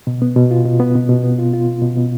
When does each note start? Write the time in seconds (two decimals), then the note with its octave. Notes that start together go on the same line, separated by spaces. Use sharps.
0.07 B2
0.22 B3
0.36 B2
0.51 F4
0.65 B2
0.80 B3
0.95 B2
1.09 B2
1.24 B3
1.38 F4
1.53 F4
1.68 B2
1.82 B2
1.97 B2